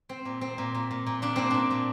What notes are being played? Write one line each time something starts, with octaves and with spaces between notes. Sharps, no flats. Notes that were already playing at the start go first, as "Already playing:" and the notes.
C4
A#2
C4
A#2
A#2
A#2
A#2
A#2 D4
A#2 C4
A#2 D4
A#2